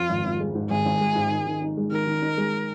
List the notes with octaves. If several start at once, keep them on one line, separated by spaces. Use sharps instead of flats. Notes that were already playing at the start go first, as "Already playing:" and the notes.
Already playing: F2 F4
G#1
G#1
G#3
G#2
G#1 G#4
G#1
G#3
G#2
D#3
D#3
D#4
G#3
D#3 A#4
D#3
D#4
G#3